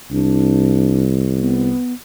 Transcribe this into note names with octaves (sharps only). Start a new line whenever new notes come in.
C2 D4
B3